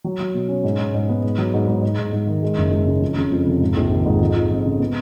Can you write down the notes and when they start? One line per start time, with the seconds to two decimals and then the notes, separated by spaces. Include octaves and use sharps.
0.04 F#3
0.20 F#3
0.34 B2
0.49 C#4
0.64 G#2
0.79 G#2
0.94 G#2
1.09 B3
1.23 G#2
1.38 F#3
1.54 G#2
1.68 G#2
1.82 G#2
1.98 G#2
2.12 G#2
2.27 D#3
2.43 G#3
2.58 F#1
2.71 G#3
2.87 C#3
3.02 F2
3.17 C#3
3.32 F2
3.47 F1
3.61 G#2
3.77 A#1
3.91 D#3
4.06 G#2
4.21 F2
4.36 F3
4.50 F2
4.66 C#3
4.80 B3